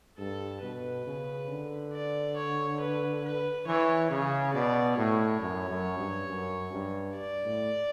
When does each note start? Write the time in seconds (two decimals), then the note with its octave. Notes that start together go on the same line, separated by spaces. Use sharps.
0.18 G2 A4
0.62 B2 B4
1.06 C#3
1.49 D3
1.93 D5
2.37 C#5
2.80 B4
3.24 B4
3.67 E3 C#5
4.10 C#3 C#5
4.54 B2 D5
4.98 A2 C#5
5.41 F#2
5.70 F#2
5.99 G2
6.28 F#2
6.72 G2
7.15 D5
7.44 A2